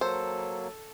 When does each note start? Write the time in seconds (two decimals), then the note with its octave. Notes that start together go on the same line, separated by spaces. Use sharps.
0.01 F#3 A#3 A4 C5